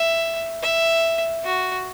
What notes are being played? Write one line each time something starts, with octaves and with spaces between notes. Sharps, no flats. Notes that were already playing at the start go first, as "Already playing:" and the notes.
Already playing: E5
E5
F#4